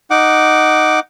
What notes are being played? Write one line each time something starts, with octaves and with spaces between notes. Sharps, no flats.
D#4 F#5 D6